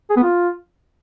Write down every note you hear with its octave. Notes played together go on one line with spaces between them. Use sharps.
G#4
B3
F4